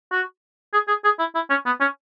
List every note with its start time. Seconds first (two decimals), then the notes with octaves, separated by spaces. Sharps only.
0.12 F#4
0.73 G#4
0.88 G#4
1.04 G#4
1.19 E4
1.35 E4
1.50 C#4
1.66 B3
1.81 C#4